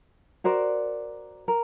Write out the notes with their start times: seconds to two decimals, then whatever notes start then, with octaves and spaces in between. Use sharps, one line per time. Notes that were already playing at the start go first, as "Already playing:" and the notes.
0.44 F#4 A#4 C5 D5
1.48 A#4